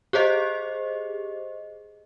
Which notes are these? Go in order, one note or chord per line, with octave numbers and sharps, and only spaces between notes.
G4 G#4 C5 D#5